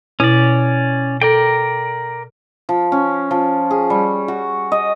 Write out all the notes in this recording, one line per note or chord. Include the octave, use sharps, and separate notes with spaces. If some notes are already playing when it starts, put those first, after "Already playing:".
B2 C#4 E4 D5
A4 A#4 D5 G5
F3
C#4
F3
G#4
G3
F#4
D#5